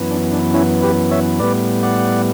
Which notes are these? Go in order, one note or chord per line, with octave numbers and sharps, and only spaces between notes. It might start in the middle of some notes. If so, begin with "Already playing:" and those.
Already playing: F#2 E3 B3
D4
D4
C#4 E4
G4 B4
C#5 E5
A2 G3 B3 B4 D5
D5 F#5